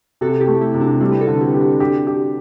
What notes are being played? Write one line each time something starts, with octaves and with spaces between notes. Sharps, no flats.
C3 F#4 A4
E4 G4
A3
E4 G4
C3
D4 F#4
G3 C4 E4
B4
F#4 A4
D3
F#4
E4 G4
G4
D4 F#4
D4 F#4 G4
G4